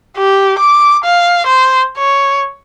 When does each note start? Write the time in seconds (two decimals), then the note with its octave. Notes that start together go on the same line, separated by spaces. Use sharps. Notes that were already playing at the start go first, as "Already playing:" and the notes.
0.18 G4
0.59 D6
1.05 F5
1.46 C5
1.98 C#5